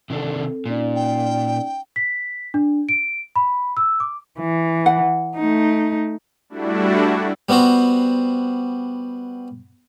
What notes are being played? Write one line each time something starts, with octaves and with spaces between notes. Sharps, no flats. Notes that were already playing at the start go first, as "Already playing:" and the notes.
C3 D#3 C4 D4 A4
A#2 C#4 D#4 D5
G5
B6
D4
D7
B5
E6
D6
E3
F#5
A3 D#4
G3 A3 D4 E4 F#4
G3 B3 C4 F#4 C5